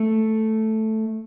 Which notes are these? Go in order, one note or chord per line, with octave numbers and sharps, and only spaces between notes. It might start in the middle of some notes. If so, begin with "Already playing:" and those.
Already playing: A3